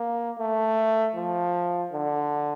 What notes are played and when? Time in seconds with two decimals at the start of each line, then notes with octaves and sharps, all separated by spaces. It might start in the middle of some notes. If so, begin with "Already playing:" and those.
Already playing: A#3
0.39 A3
1.15 F3
1.92 D3